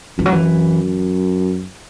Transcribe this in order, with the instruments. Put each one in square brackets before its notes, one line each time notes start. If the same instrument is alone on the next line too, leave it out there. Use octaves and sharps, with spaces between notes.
[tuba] F#2 [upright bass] E3
[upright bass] F#3
E3